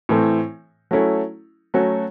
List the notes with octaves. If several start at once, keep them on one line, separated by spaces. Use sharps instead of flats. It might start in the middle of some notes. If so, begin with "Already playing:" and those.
A2 E3 A3 C4
F#3 A3 C#4 E4 A4
F#3 A3 C#4 F#4 A4